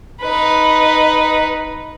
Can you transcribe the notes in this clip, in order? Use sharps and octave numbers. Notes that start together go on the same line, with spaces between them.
D#4 B4